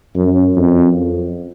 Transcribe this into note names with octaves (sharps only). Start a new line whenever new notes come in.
F#2
F2